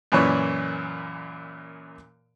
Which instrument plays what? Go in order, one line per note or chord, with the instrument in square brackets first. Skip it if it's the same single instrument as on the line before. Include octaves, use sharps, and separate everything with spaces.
[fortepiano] F#2 A#2 E3 B4 C#5 D5